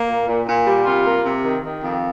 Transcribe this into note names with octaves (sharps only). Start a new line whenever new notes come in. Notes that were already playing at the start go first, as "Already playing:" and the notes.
Already playing: A#3
A#2
A#2
A#2
G3
C3 F4
A#3
C3
D#3
D#3
F2